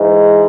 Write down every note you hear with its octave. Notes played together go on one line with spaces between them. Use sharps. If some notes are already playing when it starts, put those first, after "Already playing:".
Already playing: G#2 E3 G#3